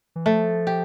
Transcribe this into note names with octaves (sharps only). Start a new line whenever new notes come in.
E3
F3 A3
G4